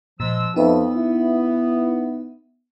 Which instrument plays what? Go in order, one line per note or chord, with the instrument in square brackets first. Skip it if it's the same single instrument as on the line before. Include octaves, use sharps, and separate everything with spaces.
[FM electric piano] A#2 [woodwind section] F3 G#3 E6
[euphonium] F2 [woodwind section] B3 [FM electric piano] D#4 B4 E5
[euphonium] E4